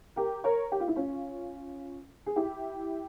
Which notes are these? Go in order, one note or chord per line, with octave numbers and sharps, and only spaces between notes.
G4 A#4
A#4 C#5
G4
F4
E4
C#4 F4
G#4
E4 G4